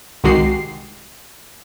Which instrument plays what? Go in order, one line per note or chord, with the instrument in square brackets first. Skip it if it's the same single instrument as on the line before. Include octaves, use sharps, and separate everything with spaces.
[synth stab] C2 D#3 G#3 F#4 G4 C7